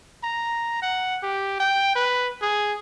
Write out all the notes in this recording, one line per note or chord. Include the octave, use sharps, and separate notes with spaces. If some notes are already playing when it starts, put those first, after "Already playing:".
A#5
F#5
G4
G5
B4
G#4